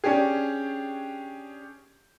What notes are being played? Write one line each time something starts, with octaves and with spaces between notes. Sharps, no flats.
C#4 D4 G4 G#4